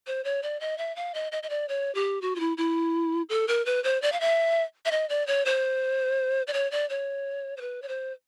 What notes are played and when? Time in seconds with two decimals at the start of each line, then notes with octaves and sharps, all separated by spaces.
0.07 C5
0.25 C#5
0.43 D5
0.61 D#5
0.78 E5
0.96 F5
1.14 D#5
1.32 D#5
1.43 D#5
1.50 D5
1.69 C#5
1.95 G4
2.22 F#4
2.36 F4
2.40 E4
2.58 E4
3.29 A4
3.48 A#4
3.66 B4
3.84 C5
4.02 D5
4.12 F5
4.21 E5
4.86 E5
4.91 D#5
5.09 D5
5.27 C#5
5.45 C5
6.47 D5
6.53 C#5
6.71 D5
6.90 C#5
7.57 C5
7.61 B4
7.82 C#5
7.88 C5